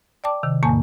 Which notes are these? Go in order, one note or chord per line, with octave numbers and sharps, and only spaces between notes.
D5 G5 A5 D6
C3 D#3
E2 A2 A#3 G#5 A5